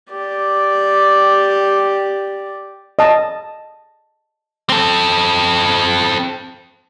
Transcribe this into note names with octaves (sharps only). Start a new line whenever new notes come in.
G4 D5
D#5 A5
C4 A4